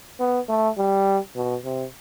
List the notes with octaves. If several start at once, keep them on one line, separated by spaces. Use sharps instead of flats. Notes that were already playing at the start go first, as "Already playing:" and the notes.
B3
A3
G3
B2
C3